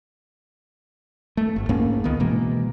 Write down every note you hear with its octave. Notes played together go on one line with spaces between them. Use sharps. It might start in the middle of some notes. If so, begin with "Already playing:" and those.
A3
G1
G#2 A#3 C#4
C#2 D#3 B3
B2 E3 G#3 A#3